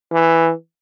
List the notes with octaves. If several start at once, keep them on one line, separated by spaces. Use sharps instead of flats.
E3